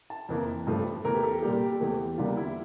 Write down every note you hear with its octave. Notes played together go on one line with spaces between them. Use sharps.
A5
F2 E3 A#3
G2 F3 A3
E2 E3 A3 A#4
G4
A4
A#2 G3 A#3 G4
E2 E3 A3
E2 D3 G3 A#3 F4
E4